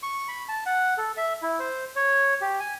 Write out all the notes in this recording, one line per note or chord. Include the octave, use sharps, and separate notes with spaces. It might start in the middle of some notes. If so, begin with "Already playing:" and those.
C#6
B5
A5
F#5
A4
E5
E4
C5
C#5
G4
G#5